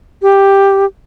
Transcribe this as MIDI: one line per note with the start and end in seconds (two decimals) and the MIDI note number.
0.22 0.85 67